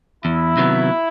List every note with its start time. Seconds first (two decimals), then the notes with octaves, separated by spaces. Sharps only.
0.25 E2 E4
0.57 C3 D#3 F#3 B3